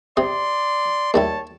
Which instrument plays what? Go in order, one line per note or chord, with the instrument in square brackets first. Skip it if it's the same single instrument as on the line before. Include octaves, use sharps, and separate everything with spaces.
[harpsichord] C3 D#6 [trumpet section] D5 C6
[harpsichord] D#2 G3 E4 [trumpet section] C#5 A5